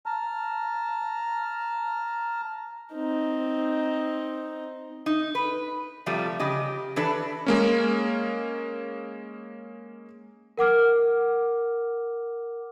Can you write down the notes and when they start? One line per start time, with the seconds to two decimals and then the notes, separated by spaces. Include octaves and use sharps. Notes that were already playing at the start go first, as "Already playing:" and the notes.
0.06 A5 A#5 F6
2.95 C4 D#4
5.06 D#4
5.35 B4
6.06 C3 F3 G3 A3
6.39 C#3 G4 D#5
6.96 E3 D4 A4 B4
7.46 G#3 A#3 C#4
10.58 A#4 F#5 D6 F6